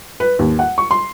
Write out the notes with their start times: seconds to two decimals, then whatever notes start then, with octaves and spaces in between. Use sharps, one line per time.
0.20 B4
0.39 D#2
0.59 F#5
0.78 C#6
0.91 C6